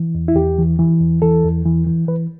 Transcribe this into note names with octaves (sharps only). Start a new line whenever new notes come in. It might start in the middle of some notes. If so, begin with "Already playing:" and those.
Already playing: E3
E2
E4
E2 G4
E3
E3
E2
E3 A4
E2
E3
E3
E3 B4